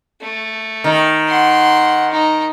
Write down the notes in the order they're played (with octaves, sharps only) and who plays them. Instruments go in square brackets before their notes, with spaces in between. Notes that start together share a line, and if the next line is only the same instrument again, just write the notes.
[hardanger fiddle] A3
[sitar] D#3
[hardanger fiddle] F#5 C6
D#4